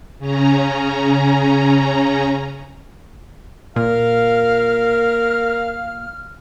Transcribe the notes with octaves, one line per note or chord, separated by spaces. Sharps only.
C#3 C#4 A#5
A#2 A#4 F5 F6